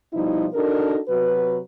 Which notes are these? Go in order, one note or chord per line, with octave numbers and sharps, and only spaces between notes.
B2 F3 G3 D#4 E4
D4 D#4 F#4 A4 A#4
C3 F#3 F#4 B4